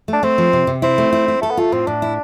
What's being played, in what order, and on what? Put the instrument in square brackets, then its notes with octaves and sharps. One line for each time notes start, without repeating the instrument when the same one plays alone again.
[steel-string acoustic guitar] A3 [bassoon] D4
[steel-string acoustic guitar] A3 [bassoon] C4
[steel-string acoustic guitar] F3
C3
C3
[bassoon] C4 [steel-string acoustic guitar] E4
[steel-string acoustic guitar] A3
E4
E4
[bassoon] A3 [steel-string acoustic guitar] A4
[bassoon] B3
[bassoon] A3 [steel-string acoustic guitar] F4
[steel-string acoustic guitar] A2 [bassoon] C4
[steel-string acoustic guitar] A2 [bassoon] D4
[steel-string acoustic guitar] E4